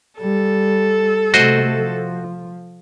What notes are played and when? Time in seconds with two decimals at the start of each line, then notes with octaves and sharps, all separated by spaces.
0.20 G3 A4
1.34 C3 A3 F#4 C5 D#5
1.76 F3